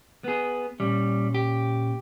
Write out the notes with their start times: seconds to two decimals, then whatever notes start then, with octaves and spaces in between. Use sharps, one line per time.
0.24 B3 G#4
0.80 A#2 G3 C#4
1.35 G4